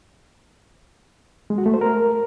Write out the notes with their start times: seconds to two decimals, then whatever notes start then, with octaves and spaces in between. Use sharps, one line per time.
1.50 G#3
1.58 F#4
1.66 A3
1.74 C5
1.81 A#4